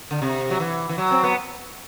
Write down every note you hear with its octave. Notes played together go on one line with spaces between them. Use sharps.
D3
C3
F#3
E3
E3
F#3
C4
B3